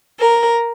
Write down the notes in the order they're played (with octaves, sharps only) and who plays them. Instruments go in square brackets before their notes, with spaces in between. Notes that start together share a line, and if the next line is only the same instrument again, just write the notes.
[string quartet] A#4